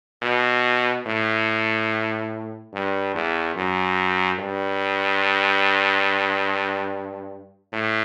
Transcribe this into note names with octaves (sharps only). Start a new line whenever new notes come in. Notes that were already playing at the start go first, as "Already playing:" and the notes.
B2
A2
G2
E2
F#2
G2
A2